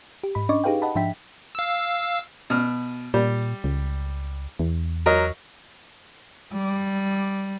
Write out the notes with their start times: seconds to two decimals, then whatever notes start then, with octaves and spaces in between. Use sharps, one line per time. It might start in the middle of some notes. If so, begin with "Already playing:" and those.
0.24 G4
0.35 G#2 B5
0.49 C#4 D4 D#5 C#6 D6
0.64 D#4 G4 G#4 B4 F5 G5
0.82 D#5 F#5 A5 B5
0.95 G#2 F3 D4 E5 G5 B6
1.55 F5 E6
2.50 B2 F6
3.14 A#2 G3
3.64 C#2
4.59 E2
5.06 F#3 A#4 D#5
6.54 G3